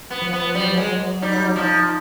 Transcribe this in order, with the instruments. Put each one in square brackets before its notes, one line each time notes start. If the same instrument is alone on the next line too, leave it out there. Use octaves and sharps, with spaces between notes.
[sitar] B3
[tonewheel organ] F3
[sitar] B3
[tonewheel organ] F#3 [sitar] G3
[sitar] G#3
[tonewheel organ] F#3
[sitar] G3 [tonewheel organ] D#4
[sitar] F3 [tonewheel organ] D#4